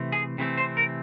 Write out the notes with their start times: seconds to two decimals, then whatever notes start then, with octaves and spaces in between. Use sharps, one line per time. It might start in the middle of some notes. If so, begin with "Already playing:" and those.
Already playing: C3 E3 A3 C4
0.12 G#4
0.38 C3 E3 A3 C4
0.57 C5
0.77 A#4